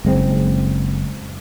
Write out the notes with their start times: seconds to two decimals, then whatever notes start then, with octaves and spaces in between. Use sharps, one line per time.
0.05 F#1 G#3 C4